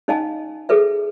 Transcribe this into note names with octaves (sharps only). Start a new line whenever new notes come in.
C#4 D#4 D#5 F5 G#5 A5
G#4 A4 B4 E5